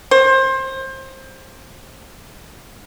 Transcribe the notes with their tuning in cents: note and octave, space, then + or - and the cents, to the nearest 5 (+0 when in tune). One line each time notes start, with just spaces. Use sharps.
C5 +25